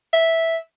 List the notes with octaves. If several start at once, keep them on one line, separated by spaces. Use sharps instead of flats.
E5